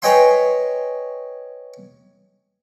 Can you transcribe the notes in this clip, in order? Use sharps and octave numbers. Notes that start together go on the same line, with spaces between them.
B4 C#5 D#5 G5 G#5 C6